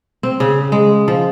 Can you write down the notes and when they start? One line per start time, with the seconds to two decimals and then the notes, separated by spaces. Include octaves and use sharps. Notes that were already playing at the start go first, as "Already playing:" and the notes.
0.23 C4
0.40 C#3
0.72 G#3
1.08 F3